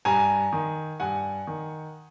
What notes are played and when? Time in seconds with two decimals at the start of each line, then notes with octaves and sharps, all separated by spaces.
0.05 G2 G#5 A#5
0.53 D#3
1.00 G2 F#5 G#5
1.47 D#3